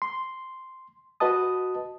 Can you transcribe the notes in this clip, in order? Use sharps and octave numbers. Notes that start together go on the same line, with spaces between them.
C6
F#4 B4 D#5 A5 D#6